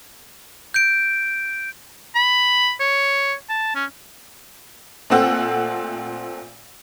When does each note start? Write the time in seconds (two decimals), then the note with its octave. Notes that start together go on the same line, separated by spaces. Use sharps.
0.74 G6 D7
2.15 B5
2.80 C#5
3.50 A5
3.75 C#4
5.10 A#2 A3 C4 F#5 E6